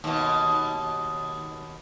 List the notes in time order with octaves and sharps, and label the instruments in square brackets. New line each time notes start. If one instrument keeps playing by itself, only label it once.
[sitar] D#2 B2